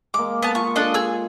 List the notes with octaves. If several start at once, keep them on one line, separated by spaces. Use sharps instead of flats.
G#3 A#3 D6
B3 A5
F4 C#6
D4 A4 D#5
G#4 E6